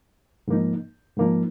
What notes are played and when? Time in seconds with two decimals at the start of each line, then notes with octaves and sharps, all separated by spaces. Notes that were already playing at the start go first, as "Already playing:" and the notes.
0.48 G#2 F3 A#3 D#4
1.17 G#2 F3 A#3 D#4